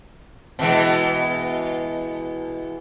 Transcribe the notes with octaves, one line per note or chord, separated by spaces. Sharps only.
B2 E3 G#3